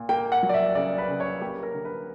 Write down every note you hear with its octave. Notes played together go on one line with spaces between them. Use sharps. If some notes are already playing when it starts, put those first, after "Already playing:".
Already playing: A#2
A#3 G5
F#5
F#3
D5
E5
C#3 D5
B4
C#3
C#5
A#3 G4
A#4
D3
B4